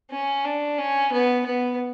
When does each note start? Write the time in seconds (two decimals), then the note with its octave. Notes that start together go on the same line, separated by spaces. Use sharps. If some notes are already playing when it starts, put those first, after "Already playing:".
0.11 C#4
0.44 D4
0.78 C#4
1.12 B3
1.46 B3